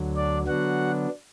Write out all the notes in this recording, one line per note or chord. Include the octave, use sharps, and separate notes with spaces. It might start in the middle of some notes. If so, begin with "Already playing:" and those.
Already playing: D2 D3 F#3
D4 D5
D3 F#3 B3 D4 F#4 F#5